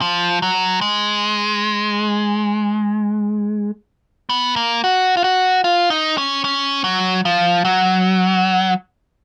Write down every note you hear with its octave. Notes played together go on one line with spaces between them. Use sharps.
F3
F#3
G#3
B3
A#3
F#4
F4
F#4
F4
D#4
C#4
C#4
F#3
F3
F#3